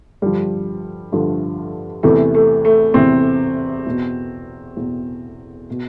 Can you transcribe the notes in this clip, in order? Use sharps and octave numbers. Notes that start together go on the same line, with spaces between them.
G2 D3 F3 G3
G2 D3 F3
E2 C3 E3 A3
A3
A3
E2 C3 E3 C4
E2 B2
E2 B2
B2